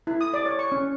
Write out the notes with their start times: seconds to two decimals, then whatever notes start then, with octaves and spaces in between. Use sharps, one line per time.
0.07 E4
0.21 D#6
0.34 D5
0.46 C#5
0.59 C#6
0.72 C#4